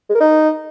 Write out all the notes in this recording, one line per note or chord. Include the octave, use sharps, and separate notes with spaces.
G#3
A#4
D#4